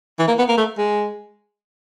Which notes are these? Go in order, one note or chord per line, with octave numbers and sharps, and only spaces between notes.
E3
A#3
B3
A#3
A3
G#3